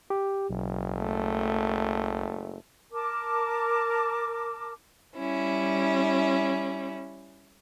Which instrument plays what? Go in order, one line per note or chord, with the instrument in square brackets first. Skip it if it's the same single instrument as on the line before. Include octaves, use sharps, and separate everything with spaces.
[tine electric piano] G4
[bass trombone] F#1 [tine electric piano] B1
[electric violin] A3
[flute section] A#4 A5 D6
[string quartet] G3 C#4 E4